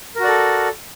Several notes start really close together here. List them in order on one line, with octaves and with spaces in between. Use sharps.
A#4 F#4 D5 A4